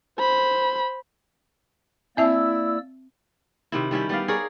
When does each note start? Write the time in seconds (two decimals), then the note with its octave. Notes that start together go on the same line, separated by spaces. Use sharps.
0.18 C5 B5
2.17 A#3 C4 E4 D5 E5 A5 E6
3.72 C3 D#3 E4
3.91 D#3 G3 C#4 E4
4.09 G3 B3 D5 F5
4.28 G#4 A#4 C#5 D5